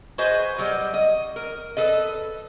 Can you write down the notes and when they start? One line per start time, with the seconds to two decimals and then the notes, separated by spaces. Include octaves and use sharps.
0.18 F#4 G#4 B4 C5 D#5
0.58 F#3 G3 D#5
0.94 D#5
1.36 A#4
1.77 A4 B4 D#5